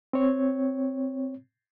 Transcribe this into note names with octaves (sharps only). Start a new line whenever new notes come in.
C4 C#5